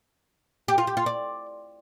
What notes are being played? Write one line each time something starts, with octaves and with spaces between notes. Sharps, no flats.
G4
F4
G4
F4
D5